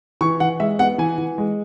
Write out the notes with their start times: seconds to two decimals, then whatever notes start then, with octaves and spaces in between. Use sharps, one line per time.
0.21 E3 C#6
0.40 E3 F#5
0.60 G#3 E5
0.79 B3 F#5
0.98 E3 G#5
1.18 E3
1.38 G#3